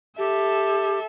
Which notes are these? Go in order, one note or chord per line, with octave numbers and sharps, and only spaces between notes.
G4 A4 E5